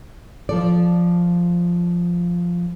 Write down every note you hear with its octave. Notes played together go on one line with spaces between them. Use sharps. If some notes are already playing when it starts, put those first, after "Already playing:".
F3 A4 D5